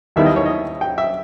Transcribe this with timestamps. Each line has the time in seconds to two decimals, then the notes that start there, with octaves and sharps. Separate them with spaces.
0.16 D#2 D#3 G3 B3 E4 E5
0.26 D#5
0.36 C#5
0.46 D#5
0.81 G5
0.98 E5